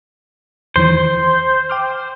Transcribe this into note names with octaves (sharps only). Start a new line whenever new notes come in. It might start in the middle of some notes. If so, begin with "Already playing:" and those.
E2 D#3 E3 C5
G5 D6 F6